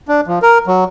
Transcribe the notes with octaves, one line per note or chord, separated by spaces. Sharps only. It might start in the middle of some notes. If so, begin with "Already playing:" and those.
D4
F3
A#4
F#3